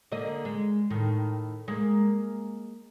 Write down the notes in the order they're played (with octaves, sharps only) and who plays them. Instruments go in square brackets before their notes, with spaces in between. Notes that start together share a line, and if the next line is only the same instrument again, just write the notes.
[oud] D3 A#3 D#5
G#3
A2 D#3
G#3 A#3